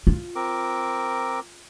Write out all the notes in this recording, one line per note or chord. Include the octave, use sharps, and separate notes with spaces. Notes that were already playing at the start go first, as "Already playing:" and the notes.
F4
C4 A#4 D6